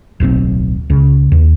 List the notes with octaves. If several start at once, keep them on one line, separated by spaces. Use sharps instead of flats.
D1 B1 B2 C4
C#2 C#3
D#2